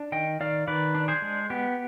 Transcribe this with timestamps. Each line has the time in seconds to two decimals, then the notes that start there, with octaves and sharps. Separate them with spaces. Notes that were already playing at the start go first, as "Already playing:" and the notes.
Already playing: D4
0.12 D#3 D#5 G5
0.40 D#3 D5 F5
0.67 D#3 B4 D5
0.95 D4
1.08 G#4 C5
1.22 G#3
1.50 B3 G4